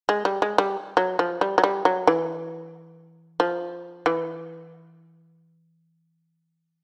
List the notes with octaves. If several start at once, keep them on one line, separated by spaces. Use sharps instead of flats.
G#3
G3
G#3
G3
F#3
F3
G3
F#3
G3
F#3
E3
F3
E3